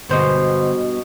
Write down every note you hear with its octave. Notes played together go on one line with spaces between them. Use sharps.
G1 G2 B2 G#3 C5